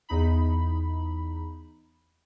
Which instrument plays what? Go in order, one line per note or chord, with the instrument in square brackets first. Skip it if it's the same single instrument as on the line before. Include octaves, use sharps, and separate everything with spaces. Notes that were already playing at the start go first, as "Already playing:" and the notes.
[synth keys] E2 D#4 B5